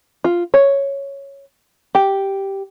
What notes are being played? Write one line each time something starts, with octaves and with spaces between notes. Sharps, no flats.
F4
C#5
G4